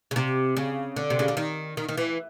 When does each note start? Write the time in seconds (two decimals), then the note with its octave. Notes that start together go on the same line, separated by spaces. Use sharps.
0.11 C#3
0.16 C3
0.57 C#3
0.96 D3
1.10 C3
1.19 C#3
1.28 D3
1.37 D#3
1.77 D#3
1.89 D#3
1.98 E3